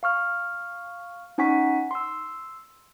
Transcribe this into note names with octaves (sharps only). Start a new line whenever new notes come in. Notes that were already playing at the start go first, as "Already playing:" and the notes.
F5 C#6 F6
C#4 D#4 F#5 G#5 C#6 B6
C6 E6